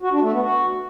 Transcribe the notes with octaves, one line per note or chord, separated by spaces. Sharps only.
F#4
D4
A3
B3
F#4